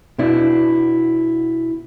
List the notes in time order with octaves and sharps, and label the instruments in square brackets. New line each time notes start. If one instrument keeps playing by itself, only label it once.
[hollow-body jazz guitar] B2 D4 E4